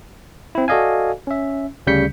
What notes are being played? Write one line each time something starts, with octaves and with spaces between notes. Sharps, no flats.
C4 E4
F#4 A4 D5 D#5 F5 G#5
C#4 E5
D2 C#3 G3 G6 B6 C#7